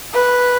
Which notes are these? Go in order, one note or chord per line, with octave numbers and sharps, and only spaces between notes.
B4